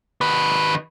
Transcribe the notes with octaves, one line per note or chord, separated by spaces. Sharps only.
D#3 B4